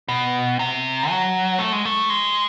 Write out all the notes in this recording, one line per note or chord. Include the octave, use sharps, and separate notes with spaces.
B2
C3
F#3
A3
G#3
A3
G#3